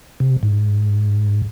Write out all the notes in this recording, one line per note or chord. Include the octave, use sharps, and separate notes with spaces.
C3
G#2